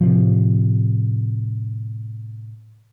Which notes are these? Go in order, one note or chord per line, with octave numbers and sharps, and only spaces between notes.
A2 C3 F3